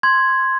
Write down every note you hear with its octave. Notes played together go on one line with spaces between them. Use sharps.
C6 G#6